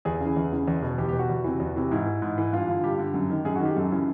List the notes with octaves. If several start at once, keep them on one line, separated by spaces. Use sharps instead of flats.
E2 G#4
C#3 E3
E2
C#3 E3
E2
B2
E2 G4
B2 G4
F#4
E2
C3 E3
E2
C3 E3
G#2 E4
E3
G#2
E3
G2 F4
D3
G2 G4
D3
F#2
D#3
F#2 G#4
D#3 F#4
G4
F#2 A4
C#3 E3